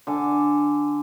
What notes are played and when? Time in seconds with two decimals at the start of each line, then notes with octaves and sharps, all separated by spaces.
0.07 D3 G#5